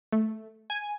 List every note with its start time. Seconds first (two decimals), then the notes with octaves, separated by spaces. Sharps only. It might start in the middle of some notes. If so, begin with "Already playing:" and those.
0.12 A3
0.70 G#5